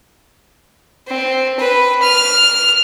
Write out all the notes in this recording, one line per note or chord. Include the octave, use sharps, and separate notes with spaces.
C4
B4
F6